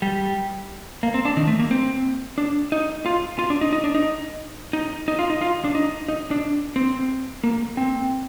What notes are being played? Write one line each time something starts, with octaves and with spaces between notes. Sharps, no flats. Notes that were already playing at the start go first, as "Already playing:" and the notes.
G3
A#3
C4
D4
D#3
A3
A#3
C4
D4
D#4
F4
F4
D4
D#4
D#4
D4
D#4
D#4
D#4
F4
D#4
F4
D4
D#4
D#4
D4
C4
A#3
C4